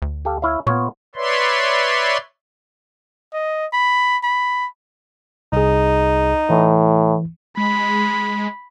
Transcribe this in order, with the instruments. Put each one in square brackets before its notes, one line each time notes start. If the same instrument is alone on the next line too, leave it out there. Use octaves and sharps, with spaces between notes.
[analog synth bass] D2
[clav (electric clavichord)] G4 A4 F5
E4 C#5 F5
[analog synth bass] A#2 [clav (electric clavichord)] B3 F4 C#5
[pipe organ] B4 C#5 D5 E5 C6
[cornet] D#5
B5
B5
[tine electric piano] C2 G#4 [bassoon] D#4
[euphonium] A2 [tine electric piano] E3
[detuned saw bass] G#3 [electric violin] B5